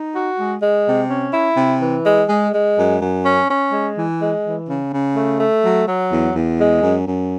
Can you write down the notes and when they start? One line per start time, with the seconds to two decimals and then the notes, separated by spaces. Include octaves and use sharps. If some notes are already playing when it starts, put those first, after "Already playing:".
Already playing: D#4
0.15 F#4
0.38 G#3
0.61 G#3
0.85 C3
1.10 C#4
1.33 E4
1.57 C3
1.81 E3
2.06 G#3
2.29 G#3
2.53 G#3
2.77 F#2
3.00 F#2
3.24 C#4
3.49 C#4
3.72 G#3
3.96 E3
4.20 G#3
4.44 E3
4.67 C#3
4.92 C#3
5.15 A3
5.39 A3
5.63 F#3
5.87 F#3
6.11 E2
6.34 E2
6.58 G#3
6.83 F#2
7.06 F#2